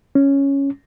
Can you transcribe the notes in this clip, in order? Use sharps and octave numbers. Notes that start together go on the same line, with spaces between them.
C#4